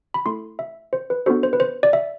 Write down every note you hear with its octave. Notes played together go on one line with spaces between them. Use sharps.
B5
A3 E4 A4 C6
E5
C5
B4
B3 D4 F#4 A4 C5
C5
B4
C5
D5
E5